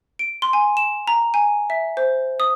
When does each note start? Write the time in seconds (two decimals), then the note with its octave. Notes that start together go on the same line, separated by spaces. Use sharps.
0.19 D7
0.42 C6
0.53 G#5
0.77 E7
1.07 A#5
1.34 G#5
1.70 E5
1.97 C5
2.40 D#6